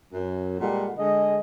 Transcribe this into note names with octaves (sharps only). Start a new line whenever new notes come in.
F#2
A#2 G3 G#3 A4 F#5
D3 G#3 G#4 D#5